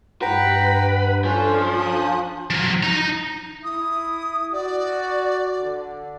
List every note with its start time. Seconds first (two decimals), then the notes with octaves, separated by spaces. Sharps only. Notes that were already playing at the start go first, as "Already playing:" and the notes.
0.22 G2 B4 F#5 G5 A#5
1.24 F3 C#4 D4 A4
1.68 D#6 F#6
2.50 F3 F#3
2.83 D#4 A#5
3.64 E4 D#6
4.53 F#4 D5
5.60 D3